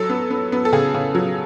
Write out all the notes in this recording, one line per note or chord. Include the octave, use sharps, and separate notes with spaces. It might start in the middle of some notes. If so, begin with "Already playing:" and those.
Already playing: F#3 A4
B3
B3
B3
A4
C#3 G#4
C#3
F#3